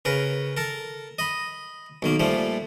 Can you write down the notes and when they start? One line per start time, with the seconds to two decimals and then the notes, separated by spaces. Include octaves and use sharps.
0.05 C#3 A#4 B4
0.57 A4 A#4
1.19 D#5 B5
2.02 B1 D#3 A#3
2.20 A#2 F3 G3 A3